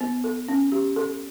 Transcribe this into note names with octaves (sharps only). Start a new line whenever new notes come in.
B3
A4
C#4
G4
A4